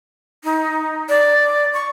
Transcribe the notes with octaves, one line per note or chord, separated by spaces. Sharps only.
D#4
D5
C#6